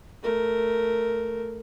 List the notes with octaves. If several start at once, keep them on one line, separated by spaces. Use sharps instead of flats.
A3 A#4